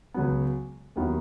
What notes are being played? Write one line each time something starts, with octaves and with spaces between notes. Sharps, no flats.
C#2 C#3 F#3 B3
D#2 D#3 F#3 B3 E4